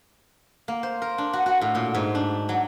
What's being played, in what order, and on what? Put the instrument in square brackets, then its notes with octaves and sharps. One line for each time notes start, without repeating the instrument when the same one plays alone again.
[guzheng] A#3
C5
A#4
D4
F#4
F#4
A2
A#2
G#2
D4
F#3